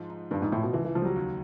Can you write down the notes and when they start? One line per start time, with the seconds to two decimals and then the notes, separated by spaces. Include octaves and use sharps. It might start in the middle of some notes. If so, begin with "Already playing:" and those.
Already playing: G#2 F3
0.10 D#4
0.31 G2 F3
0.42 G#2
0.52 A2 F3
0.63 B2
0.73 C#2 E3
0.85 E3
0.95 C#2 F3
1.02 G3
1.05 F#3
1.16 D#2